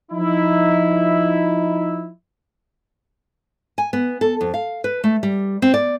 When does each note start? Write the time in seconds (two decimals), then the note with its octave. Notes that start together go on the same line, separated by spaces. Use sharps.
0.12 F3 D#4 E4
3.78 G#5
3.93 B3
4.21 A4
4.41 F2
4.54 F5
4.84 B4
5.04 A3
5.23 G3
5.62 C4
5.74 D5